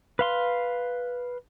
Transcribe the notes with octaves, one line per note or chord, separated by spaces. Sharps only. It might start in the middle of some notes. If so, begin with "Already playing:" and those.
B4 F5 C6